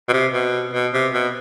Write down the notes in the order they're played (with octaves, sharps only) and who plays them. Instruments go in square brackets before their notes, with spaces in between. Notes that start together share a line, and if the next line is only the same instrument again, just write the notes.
[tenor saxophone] B2
C3
B2
B2
C3
B2